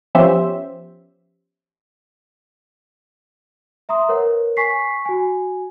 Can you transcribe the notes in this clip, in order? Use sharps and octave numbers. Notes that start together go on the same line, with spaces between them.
F3 B3 C#4 G4 C5 E5
E5 A#5 C6 D#6
A#4 B4 C#5 F#5
G#5 C#6 B6 C7
F#4 G#5